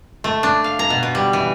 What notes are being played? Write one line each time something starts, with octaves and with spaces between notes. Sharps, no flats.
A3
D4
F5
A#5
B2
B2
G3
E3